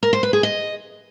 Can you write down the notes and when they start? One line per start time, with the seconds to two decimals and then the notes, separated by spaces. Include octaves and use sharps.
0.03 A#4
0.13 C5
0.23 B4
0.33 G#4
0.43 D#5